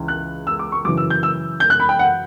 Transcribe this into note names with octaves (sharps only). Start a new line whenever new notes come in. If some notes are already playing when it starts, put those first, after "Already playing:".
Already playing: C#2 C#3 E3
F#6
E6
D6
C#6
F#2 C#3 E3 D6
E6
G6
E6
G6
F#6
B5
G5
F#5